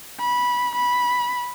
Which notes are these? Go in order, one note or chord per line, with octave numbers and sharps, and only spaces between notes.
B5
B5